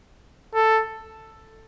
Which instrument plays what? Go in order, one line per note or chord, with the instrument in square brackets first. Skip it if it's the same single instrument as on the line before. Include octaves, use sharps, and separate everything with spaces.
[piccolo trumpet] A4